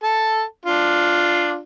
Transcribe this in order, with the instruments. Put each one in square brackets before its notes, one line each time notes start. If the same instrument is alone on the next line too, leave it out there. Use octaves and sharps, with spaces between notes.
[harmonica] A4 A5
D4 F4